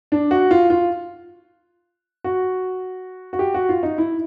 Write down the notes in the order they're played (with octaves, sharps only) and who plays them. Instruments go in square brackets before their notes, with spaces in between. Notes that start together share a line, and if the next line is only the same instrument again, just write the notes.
[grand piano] D4
F#4
F4
F4
F#4
F#4
G4
F#4
F4
D#4
E4